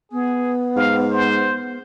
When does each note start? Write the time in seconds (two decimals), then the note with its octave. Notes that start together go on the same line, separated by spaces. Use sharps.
0.11 B3 G#4
0.76 G#2 F5
1.11 C5